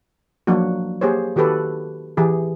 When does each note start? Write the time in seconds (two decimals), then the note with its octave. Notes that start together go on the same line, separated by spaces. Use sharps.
0.47 F3 F#3 A#3 D4 F#4
1.01 A#3 G4 G#4 C5 C#5
1.36 D#3 F#4 G4 A4 B4
2.17 E3 G4 G#4